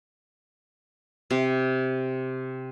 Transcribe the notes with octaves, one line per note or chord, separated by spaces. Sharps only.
C3